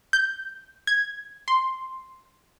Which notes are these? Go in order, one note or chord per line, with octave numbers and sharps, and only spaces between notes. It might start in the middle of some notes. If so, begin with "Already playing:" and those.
G6
G#6
C6